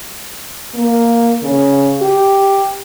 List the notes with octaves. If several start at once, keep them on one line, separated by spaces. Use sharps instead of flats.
A#3
C#3
G4